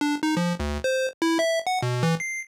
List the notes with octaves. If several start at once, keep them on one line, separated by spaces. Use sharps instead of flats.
D4
D#4
F3
D2
C5
E4
E5
F#5
B2
E3
C7